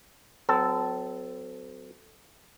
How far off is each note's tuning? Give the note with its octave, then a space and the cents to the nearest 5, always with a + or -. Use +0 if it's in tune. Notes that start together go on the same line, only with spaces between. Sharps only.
F#3 +0 C4 -40 A4 +0